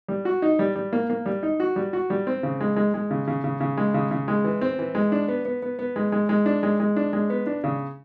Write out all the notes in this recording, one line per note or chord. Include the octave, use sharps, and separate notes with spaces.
G3
F#4
D#4
G3
G3
A#3
A#3
G3
D#4
F#4
G3
F#4
G3
C4
C#3
G#3
G#3
G#3
C#3
C#3
C#3
C#3
G#3
C#3
C#3
G#3
E3
C4
E3
G#3
D4
B3
B3
B3
B3
G#3
G#3
G#3
D4
G#3
G#3
D4
G#3
B3
D4
C#3